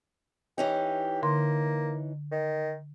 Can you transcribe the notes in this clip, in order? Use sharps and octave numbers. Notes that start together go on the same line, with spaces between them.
E3 C#4 D#4 G4
D3 A#3 C6
D#3